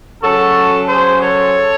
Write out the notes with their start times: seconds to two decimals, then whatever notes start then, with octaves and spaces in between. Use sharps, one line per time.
0.23 C#3 F#3 C#4 F#4 A4
0.89 G#4 C5
1.22 A4 C#5